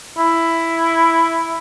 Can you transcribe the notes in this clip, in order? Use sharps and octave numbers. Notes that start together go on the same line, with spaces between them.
E4